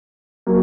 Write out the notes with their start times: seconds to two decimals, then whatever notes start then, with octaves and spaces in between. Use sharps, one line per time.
0.47 F#3 A#3